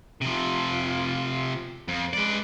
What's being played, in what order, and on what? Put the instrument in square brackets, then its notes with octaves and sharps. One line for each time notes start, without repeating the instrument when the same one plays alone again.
[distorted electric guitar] C3 F3 [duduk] F4
[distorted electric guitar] F2
[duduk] G#3 [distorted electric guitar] B4 D5